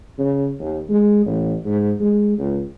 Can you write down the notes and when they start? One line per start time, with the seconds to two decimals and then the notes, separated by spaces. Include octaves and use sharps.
0.18 C#3
0.59 D#2
0.89 G#3
1.26 A1
1.65 G#2
2.00 G#3
2.38 C#2